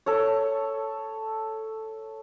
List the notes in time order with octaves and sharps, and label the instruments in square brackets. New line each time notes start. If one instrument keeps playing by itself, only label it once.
[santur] A4 C#5